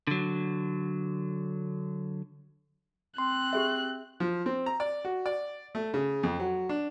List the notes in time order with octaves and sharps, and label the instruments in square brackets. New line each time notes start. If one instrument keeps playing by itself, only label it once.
[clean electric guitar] D3 F#3
[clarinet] C4 [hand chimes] C6 [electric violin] F#6
[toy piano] G4 G#4 E5
[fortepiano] F3
C4
A#5
D5
F#4
D5
A3
C#3
F2
F#3
D4